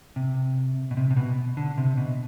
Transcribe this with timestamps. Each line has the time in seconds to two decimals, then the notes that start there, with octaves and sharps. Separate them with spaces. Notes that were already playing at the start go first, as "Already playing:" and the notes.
0.16 C3
0.91 B2
0.97 C3
1.11 C3
1.17 B2
1.57 D3
1.78 C3
1.97 B2